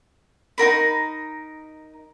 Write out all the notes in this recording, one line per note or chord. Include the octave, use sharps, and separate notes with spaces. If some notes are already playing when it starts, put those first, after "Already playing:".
D#4 F4 A#4 B5